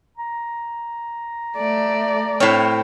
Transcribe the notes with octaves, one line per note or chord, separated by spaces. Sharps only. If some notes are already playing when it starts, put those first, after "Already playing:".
A#5
A3 D5
A2 C4 C#5 F6